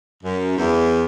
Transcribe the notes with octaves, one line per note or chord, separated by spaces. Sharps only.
F#2
E2